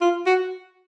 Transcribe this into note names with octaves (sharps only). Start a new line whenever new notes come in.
F4
F#4